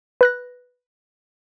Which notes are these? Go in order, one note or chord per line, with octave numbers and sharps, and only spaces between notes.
B4 F#6 A#6